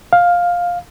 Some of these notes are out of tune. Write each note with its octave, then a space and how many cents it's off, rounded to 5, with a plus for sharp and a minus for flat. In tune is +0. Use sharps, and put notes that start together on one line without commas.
F5 +10